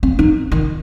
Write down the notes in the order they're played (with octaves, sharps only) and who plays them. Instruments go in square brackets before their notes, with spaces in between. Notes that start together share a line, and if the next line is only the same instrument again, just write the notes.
[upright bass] C4
D#4
D#3